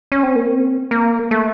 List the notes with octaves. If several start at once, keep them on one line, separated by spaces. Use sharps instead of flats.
C#4
C4
A#3
C4
A#3
A3